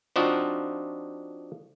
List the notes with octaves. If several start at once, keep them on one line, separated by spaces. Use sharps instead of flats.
F3 C4 D4 D#4 F4 F#4